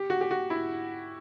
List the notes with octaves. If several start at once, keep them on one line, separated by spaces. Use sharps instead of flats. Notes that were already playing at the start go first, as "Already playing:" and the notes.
Already playing: G4
F#4
G4
F#4
E4